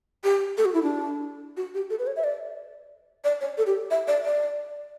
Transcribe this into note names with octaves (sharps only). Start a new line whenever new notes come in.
G4
A4
F#4
E4
D4
F#4
G4
A4
B4
C#5
E5
D5
D5
C#5
A4
G4
E5
D5
D5